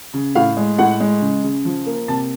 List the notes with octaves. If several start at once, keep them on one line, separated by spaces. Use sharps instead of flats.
C#3
A2 F5
G#3
A2 F#5
G#3
C#3
C#3
F3
A#3
C3 A5